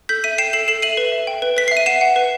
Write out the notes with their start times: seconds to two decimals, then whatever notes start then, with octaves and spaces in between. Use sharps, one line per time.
0.09 A4 G6 B6
0.24 E5 B6 D#7
0.38 G5 C7 E7
0.53 A4 C7 E7
0.68 A4 C7 E7
0.82 E5 D#7 F#7
0.97 B4
1.12 E5
1.27 G5
1.42 B4
1.57 B4 B6
1.68 E5 C7
1.77 D#7
1.86 F#5 C7 E7
2.01 F#5
2.16 B4